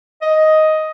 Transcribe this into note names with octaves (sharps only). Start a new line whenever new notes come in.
D#5